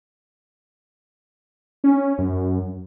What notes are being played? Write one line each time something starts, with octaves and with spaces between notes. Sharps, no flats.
C#4
F#2